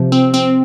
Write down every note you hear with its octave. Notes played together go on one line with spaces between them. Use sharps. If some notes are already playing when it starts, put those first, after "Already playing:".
Already playing: C3 F3
C4
C4